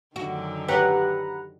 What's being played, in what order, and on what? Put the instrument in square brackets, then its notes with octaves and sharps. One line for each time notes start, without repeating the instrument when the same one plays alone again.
[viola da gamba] F#2 D3 D#3 [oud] F#4
[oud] G4 C#5 [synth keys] B4 F#5 A#5